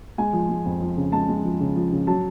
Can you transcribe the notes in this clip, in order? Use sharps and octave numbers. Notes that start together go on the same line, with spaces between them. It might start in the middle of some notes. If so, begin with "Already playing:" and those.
G#3 G#5
F3
G#3
F2
F3
C#3
G#3 A5
G#3
F3
C#3
F3
C#3
F#3 A5